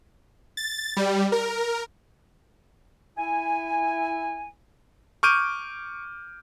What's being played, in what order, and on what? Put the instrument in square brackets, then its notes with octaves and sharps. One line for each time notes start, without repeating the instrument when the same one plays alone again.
[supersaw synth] A6
G3
A#4
[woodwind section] E4 G#5
[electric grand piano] C#6 D6 F6 G6 D7 D#7